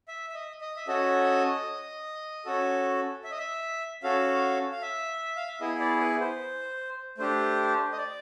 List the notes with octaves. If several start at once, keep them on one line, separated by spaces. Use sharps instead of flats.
E5
E5
D#5
D#5
E5
C#4 F#4 A4 D#5
C#4 F#4 A4
E5
D#5
E5
C#4 F#4 A4 F5
F5
E5
F5
E5
B3 E4 G#4 D#5
D5
B4
C5
A3 D4 G4 C5
D#5
D5